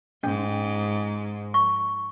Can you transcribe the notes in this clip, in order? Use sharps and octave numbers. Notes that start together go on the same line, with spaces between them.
G#2 C#4
C#6